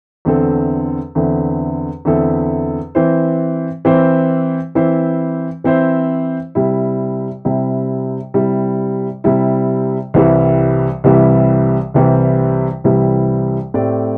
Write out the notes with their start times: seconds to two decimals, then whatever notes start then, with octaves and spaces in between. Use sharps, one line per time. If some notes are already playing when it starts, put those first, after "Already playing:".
0.25 E2 D3 C4 E4 A4
1.15 E2 D3 C4 E4 A4
2.05 E2 D3 C4 E4 A4
2.95 E3 C4 E4 C5
3.85 E3 C4 E4 C5
4.75 E3 C4 E4 C5
5.64 E3 C4 E4 C5
6.55 C3 G3 E4
7.45 C3 G3 E4
8.34 C3 G3 E4
9.24 C3 G3 E4
10.14 C2 C3 E3 G3 E4
11.04 C2 C3 E3 G3 E4
11.94 C2 C3 E3 G3 E4
12.84 C2 C3 E3 G3 E4
13.74 A2 A3 C4 G4 D5